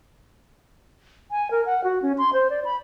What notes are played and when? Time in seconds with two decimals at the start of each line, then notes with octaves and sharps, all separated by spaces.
1.31 G#5
1.51 A#4
1.66 F#5
1.84 F#4
2.02 C#4
2.18 C6
2.33 C5
2.50 D5
2.65 B5